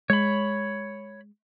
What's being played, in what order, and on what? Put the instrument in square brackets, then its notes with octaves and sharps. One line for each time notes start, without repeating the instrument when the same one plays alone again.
[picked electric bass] G#3 [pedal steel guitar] C#5 B5